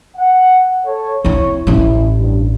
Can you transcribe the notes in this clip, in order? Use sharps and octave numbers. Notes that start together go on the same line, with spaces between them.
F#5
A4 C#5
C4 E4 C#5
A1 C#4 E4
G2